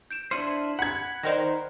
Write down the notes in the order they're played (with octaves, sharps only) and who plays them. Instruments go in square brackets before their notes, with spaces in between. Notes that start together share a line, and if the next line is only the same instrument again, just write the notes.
[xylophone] G6 D7 E7
[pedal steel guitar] D4 E4 C5 [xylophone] F6 C#7 D#7
[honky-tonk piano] F#5 G#6 [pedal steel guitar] B5
[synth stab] D#3 A#4 C5 [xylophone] D5 A#6